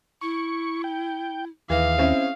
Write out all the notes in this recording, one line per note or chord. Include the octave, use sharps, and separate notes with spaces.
E4 C#6
G5
D#2 E3 G#4 F5
C4 C#4 E4